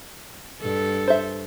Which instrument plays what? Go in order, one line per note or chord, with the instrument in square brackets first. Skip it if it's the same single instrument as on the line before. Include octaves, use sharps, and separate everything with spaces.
[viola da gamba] G2 A4
[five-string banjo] C5 E5